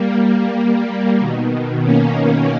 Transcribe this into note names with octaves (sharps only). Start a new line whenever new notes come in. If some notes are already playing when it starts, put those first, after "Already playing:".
Already playing: G3 A#3
B2 D#3
A#3 C#4